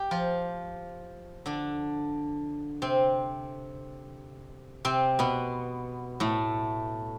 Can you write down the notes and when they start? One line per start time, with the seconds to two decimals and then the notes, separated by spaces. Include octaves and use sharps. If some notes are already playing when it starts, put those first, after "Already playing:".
Already playing: G4
0.11 F3 F4
1.46 D3 D4
2.82 C3 C4
4.85 C3 C4
5.19 B2 B3
6.20 A2 A3